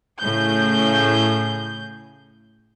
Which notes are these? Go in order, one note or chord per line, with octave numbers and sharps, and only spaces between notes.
A2 C#3 G#4 G6